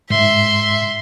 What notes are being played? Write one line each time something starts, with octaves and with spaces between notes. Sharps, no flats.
G#2 E5 C6